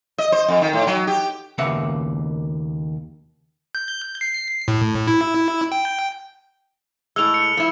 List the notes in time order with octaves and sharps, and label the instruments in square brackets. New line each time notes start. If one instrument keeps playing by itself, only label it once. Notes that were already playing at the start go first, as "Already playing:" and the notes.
[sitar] D#5
C5
F2
D#3
A2
F#3
G4
[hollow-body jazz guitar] D#2 C#3 A#3 B4 E5 F#5
[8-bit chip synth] G6
C7
A2
E4
G5
[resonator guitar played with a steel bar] A2 G#3 [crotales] E6 F6 F7
[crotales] C#7
[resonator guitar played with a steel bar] F3 E4